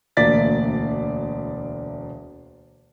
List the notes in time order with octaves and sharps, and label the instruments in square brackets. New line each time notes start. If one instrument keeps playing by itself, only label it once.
[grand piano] E1 D2 A#3 D5 A6 B6